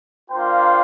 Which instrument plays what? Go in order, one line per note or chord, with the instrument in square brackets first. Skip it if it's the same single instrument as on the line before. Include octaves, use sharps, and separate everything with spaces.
[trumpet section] A#3 D4 F4 C5 G5